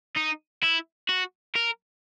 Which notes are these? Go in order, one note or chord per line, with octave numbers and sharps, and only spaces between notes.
D#4
E4
F#4
A#4